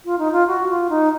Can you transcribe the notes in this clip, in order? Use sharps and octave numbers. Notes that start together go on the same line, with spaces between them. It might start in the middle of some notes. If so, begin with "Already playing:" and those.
F4
D#4
F4
F#4
F4
D#4